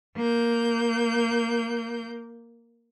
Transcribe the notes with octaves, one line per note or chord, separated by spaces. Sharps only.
A#3 G6